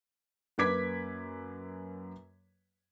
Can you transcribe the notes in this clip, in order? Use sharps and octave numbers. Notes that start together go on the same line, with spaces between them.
F#2 A#3 B4 D6 G#6 B6